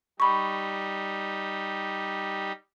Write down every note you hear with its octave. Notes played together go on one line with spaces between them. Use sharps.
G3 D#4 G4 B5 C#6